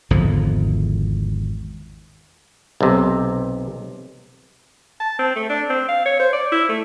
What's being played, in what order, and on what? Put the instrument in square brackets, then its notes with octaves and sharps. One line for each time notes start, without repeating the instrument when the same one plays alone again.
[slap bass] G#1 E2 D3 F3
[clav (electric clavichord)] B1 C3
[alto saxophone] A5
C4
A3
D4
C4
F5
C#5
C5
D5
E4
A3